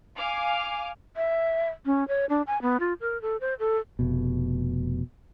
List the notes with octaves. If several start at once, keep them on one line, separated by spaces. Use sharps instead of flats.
F5 G#5 D6 F6
E5
C#4
C#5
D4
G#5
B3
F4
A#4
A4
C5
A4
F1 B2